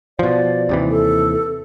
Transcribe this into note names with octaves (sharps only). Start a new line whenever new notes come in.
B2 F3 D5
D#2 C3 E3
A4